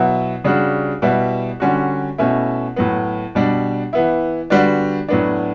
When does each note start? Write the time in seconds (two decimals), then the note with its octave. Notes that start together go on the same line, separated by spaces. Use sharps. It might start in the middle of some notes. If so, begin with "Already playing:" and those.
Already playing: B2 F#3 B3 E4
0.44 C#3 G3 D4 F#4
1.02 B2 G3 B3 E4
1.60 D3 G3 C#4 F#4
2.18 B2 A3 C#4 E4
2.76 A2 F#3 B3
3.35 B2 G3 D4
3.93 E3 B3 E4
4.50 D3 G3 B3 D4 F#4
5.08 A2 F#3 B3 D4